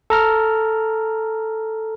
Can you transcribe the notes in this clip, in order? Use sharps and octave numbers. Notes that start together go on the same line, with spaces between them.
A4 A#5 F6